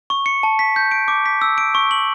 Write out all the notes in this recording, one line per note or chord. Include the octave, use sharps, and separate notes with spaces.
C#6
C#7
A5
B6
G6
D7
D6
B6
E6
D7
C#6
F#7